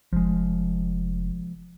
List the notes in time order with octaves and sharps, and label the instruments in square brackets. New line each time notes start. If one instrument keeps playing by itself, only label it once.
[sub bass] F1 [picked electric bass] F3 G#3